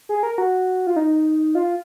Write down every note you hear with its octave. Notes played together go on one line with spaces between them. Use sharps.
G#4
A#4
F#4
F4
D#4
F4